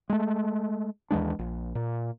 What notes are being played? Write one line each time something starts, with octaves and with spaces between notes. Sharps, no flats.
G#3 A3
D#2 E3 G#3 D4
A#1
A#2